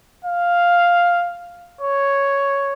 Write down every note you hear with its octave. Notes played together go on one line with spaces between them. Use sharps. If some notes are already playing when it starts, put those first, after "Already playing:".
F5
C#5